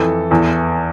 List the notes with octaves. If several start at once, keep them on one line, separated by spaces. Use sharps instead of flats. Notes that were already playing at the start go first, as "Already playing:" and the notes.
Already playing: F2 E3 A4
E2 E3